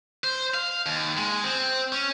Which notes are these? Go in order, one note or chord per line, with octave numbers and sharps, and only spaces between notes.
C5
F5
D#2
G#3
C4
C#4